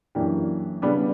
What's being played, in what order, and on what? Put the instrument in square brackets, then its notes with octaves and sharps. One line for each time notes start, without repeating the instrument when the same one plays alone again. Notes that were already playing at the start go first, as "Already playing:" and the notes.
[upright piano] F#2 E3 A#3 D4 G4
C#3 G3 B3 D4